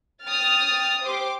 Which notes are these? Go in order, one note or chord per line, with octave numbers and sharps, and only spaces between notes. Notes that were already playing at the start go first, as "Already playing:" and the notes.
G5 D#6 F6 A6
G4 C5 C6 D6